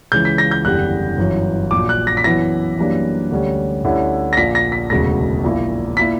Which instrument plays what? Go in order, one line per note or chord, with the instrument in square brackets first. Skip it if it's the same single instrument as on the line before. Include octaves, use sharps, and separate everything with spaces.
[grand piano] C#2 C#3 E3 G6
B6
A#6
G6
F#1 E2 D3 G3 F#6
G1 F#2 E3
A#1 A#2 F#3 D6
F#6
A#6
B6
F#2 E3 B3 E4 A#6
F#2 E3 G3 A#3 D4
D2 D3 G3 C#4
D2 D3 G3 C#4 E4
A#6
A#1 A#2 A#3 B6
A#6
B6
E1 D2 C#3 F#3 A#6
A#1 A#2 A#3 E4
A#2 A#3 E4 B6